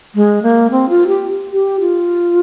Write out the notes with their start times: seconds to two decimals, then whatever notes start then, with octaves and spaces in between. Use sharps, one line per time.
0.15 G#3
0.43 A#3
0.71 C4
0.89 F4
1.07 G4
1.52 G4
1.80 F4